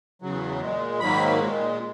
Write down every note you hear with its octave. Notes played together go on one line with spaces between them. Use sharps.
E2 C#3 F#3
A#2 G#3
G#2 D#3 F#3 A#3 B5
A#2 G#3